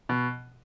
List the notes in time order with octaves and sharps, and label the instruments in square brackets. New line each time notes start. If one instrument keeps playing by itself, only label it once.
[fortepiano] B2